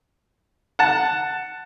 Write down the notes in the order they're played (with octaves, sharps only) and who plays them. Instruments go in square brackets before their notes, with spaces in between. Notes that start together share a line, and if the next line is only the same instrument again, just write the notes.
[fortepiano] F#5 A5